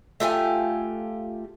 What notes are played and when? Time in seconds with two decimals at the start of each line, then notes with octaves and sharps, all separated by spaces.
0.20 A3 F4 G4 G#5